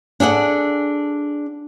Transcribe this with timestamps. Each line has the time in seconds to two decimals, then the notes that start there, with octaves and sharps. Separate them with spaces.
0.20 D4 G#4 A4 F#5